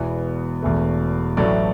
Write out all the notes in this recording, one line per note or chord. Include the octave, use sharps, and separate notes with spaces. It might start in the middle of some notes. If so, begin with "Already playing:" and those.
Already playing: E1 E2 E3 B3
E1 E2 E3 A3
A1 A2 F#3 A3 D5